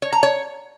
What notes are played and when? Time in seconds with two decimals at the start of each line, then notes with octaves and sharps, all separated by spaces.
0.02 C#5
0.13 A#5
0.23 C#5